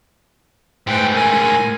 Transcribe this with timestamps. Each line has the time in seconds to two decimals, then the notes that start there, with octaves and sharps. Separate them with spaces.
0.87 A2 G#3 B4 C5 G5
1.15 A#4 G#5